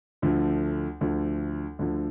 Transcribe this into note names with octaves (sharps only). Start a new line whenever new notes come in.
D2 D3 F3
D2 D3 F3
D2 D3 F3